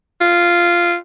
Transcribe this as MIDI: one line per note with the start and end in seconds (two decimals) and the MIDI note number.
0.21 0.95 65